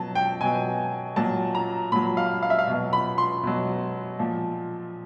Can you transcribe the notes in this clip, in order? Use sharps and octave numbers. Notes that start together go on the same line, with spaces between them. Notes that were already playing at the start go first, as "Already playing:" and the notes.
Already playing: B2 F#3 A5
G5
B2 F#3 G#5
A#2 F#3 A5
A#5
A#2 F#3 B5
F5
F5
E5
F5
B2 F#3
B5
C6
B2 F#3
A#2 F3